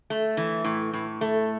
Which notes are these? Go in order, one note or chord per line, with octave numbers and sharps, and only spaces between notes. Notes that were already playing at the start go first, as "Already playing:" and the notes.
A3
E3
A2
A2
A3